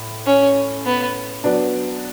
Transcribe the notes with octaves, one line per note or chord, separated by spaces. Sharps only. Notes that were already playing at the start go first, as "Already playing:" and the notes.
Already playing: A2
C#4
B3
F#3 B3 D4